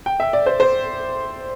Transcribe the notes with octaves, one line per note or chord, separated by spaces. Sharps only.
G5
E5
D5
C5
C5